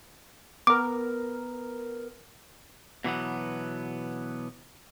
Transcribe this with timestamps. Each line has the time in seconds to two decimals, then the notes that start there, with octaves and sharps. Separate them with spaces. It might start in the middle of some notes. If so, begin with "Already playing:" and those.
0.67 B3 A#4 D6
3.04 B2 E3 F#3 B3